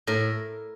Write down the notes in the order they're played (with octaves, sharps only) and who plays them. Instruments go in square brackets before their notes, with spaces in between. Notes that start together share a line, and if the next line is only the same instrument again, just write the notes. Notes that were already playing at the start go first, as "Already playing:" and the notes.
[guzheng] A2 A#4